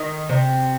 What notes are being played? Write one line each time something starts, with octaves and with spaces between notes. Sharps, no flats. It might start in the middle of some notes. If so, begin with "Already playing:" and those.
Already playing: D#3
C3